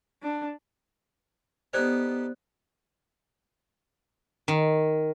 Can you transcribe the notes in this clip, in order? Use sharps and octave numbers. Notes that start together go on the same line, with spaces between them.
D4
B3 D#4 G4 A4 C5 D5 F#6
D#3